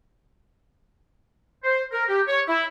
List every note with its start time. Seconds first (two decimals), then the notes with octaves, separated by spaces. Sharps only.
1.64 C5
1.92 A#4
2.08 G4
2.28 C#5
2.48 E4